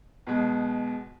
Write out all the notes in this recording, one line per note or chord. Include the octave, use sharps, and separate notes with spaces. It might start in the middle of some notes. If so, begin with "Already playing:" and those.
B1 B2 G#3